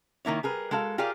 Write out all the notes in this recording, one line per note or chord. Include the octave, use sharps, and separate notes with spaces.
D#3 A#3 E4 C#5
G3 G#4 A#4 B4
G#3 F#4 A4 A#4 F5
F4 G4 G#4 A#4 D5 F5